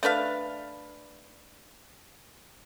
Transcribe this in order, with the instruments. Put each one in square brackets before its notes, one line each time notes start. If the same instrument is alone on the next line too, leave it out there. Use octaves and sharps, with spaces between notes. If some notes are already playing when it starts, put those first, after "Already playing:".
[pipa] A3 D4 B4 F5